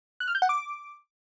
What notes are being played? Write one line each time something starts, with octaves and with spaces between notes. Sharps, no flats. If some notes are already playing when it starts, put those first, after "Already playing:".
F#6
F6
G6
F#5
D6